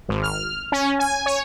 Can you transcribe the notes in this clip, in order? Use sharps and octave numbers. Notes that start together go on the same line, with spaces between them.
G#1
F6
C#4
G#5
C#5